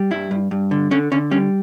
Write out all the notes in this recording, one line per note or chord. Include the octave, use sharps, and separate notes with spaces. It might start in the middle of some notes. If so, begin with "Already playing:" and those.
Already playing: G3
G2 E4
G2
G2
D3
D3 C#4
D3 C#4
G3 C#4